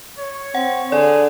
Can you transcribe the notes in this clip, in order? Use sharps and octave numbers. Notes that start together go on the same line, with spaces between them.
C#5
C4 F#5
D3 G#4 D5